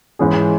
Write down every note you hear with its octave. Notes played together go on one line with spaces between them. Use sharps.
G#2 E3 G#3 C#4 G#4